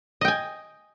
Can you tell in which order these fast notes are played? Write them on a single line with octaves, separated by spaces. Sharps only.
D#5 G5 G#5